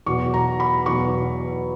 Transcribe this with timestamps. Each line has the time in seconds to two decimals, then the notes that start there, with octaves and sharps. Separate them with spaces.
0.06 E2 B2 F#3 C#6
0.34 A#5
0.60 B5
0.86 E2 B2 F#3 C#6